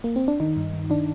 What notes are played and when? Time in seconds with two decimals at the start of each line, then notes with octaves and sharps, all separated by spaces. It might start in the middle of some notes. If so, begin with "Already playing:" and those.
0.04 A#3
0.16 C4
0.28 D4
0.40 D#3 D#4
0.57 G2
0.73 D#3
0.90 D#3 D4